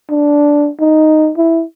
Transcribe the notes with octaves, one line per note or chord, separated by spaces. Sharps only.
D4
D#4
E4